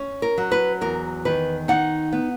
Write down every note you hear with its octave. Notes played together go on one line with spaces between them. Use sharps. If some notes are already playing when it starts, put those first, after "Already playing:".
Already playing: C#4
A#4
F#3
B4
E2 A#4
D#3 B4
D#4 F#5
B3